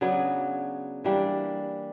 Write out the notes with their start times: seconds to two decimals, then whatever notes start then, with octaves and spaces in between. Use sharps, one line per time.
0.01 C#3 F#3 B3 D4
1.04 E3 G3 A#3 D4